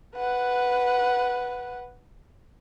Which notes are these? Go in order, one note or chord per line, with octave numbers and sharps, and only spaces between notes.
B4 F#5